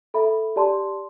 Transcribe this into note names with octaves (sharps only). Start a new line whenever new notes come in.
A4 E5 B5
G4 D5 A5 C6